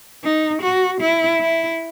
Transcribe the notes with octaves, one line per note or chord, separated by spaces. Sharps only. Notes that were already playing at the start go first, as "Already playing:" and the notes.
D#4
F#4
E4
E4